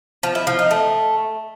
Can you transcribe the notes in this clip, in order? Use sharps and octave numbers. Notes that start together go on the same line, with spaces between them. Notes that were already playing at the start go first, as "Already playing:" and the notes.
F3
E4
F3
D#4
A3